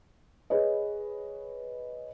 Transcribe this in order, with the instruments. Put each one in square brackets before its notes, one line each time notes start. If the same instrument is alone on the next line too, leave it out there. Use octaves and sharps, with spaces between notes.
[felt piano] G#4 B4 C#5 D#5